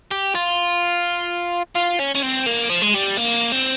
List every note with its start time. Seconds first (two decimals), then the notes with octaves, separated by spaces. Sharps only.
0.11 G4
0.35 F4
1.76 F4
2.00 C#4
2.15 C#4
2.23 C4
2.46 A#3
2.70 F3
2.82 G#3
2.94 G3
3.17 A#3
3.52 C4